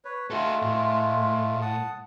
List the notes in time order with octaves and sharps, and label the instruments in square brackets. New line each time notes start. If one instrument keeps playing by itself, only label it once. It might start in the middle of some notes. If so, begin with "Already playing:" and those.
[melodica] B4 C#5
[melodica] G#3 A3 F4 [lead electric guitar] F#4 A4
[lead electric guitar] A2
[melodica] F#5 A5 D#6